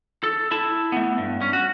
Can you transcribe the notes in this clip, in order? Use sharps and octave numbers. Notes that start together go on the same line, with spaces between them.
A4
E4 A5
A3 B3
G2
C#4
F#4